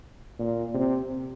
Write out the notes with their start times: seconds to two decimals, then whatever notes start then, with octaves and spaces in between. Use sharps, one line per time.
0.39 A#2
0.74 C3